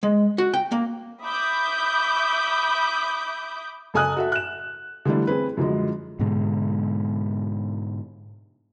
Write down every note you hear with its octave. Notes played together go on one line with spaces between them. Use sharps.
G#3
F#4
G5
A#3
E5 B5 D6 D#6 G6
F#1 A4 G#5 D#6 F#6
F#4 A4 E5
F#6 E7
D3 E3 G3 A3 D4
C4 G#4 B4
F#2 D3 F3 G#3
G#2 B2 D3 G#3